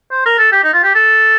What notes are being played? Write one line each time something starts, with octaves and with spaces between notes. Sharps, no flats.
C5
A#4
A4
G4
D#4
F4
G4
A4